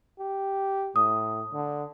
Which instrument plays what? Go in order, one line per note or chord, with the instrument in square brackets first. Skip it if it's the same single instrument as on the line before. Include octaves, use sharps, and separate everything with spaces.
[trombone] G4
[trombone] A2 [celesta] D#6
[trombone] D3